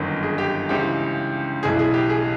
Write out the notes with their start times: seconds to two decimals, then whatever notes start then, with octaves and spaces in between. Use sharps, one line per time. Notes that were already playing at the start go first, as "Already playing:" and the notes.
Already playing: G1 F#2 D#3
0.23 G#4
0.38 G4
0.69 C#2 C#3 E3 G4
1.63 B1 A2 E3 G#4
1.79 G#4
1.94 G4
2.09 G#4